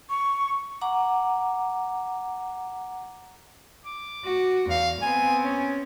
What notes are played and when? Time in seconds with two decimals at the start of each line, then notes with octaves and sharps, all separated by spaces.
0.10 C#6
0.81 F#5 A#5 D6
3.85 D6
4.25 F#4
4.70 E2 F5
5.02 B3 C4 G#5
5.43 C#4